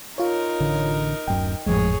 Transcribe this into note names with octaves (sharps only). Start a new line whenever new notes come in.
D#4 F4 A#4 C#5
A1 D3
D1 F#2 G5
G#1 F2 A2 F3 G#3 G#4 C#5